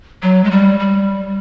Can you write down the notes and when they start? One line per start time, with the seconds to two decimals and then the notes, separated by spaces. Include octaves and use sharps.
0.22 F#3
0.44 G#3
0.51 G3
0.79 G3